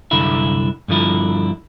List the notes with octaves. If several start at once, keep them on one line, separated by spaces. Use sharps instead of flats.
C2 F#2 D3 E4 E5
G2 D3 F3 E4